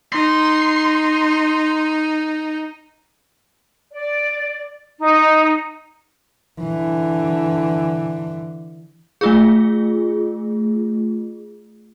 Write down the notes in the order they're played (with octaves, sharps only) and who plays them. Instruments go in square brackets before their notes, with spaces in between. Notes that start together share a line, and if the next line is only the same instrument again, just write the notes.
[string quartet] D#4 [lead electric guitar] C6
[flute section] D5
D#4
[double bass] D3 E3
[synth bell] A3 F4 G#4